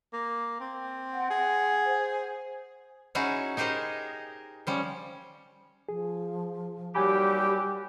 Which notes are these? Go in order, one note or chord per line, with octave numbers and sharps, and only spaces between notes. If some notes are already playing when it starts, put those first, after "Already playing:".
A#3
C4
F#5
G#4
C5
C#4 D#4 E4 F#4 G#4
D#4 G4 G#4 A#4 C5 D#5
F3 G3 C#4
F3 G#4
D#2 F#3 G3 G4 G#5 B5